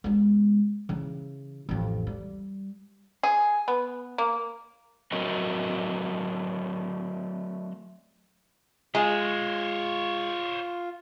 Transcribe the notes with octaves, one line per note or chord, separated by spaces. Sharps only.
G#3 B3
C#3 E3
A1 F2
G3
G#4
B3
A#3
F#3 A3 C4 F#4 A#4 D#5
G#3 F4 C5 C#5